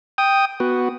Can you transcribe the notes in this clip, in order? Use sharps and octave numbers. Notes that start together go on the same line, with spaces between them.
G5 D#6
B3 F#4